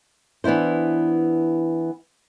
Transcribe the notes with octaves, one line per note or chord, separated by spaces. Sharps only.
E3 B3 D4 E4 C5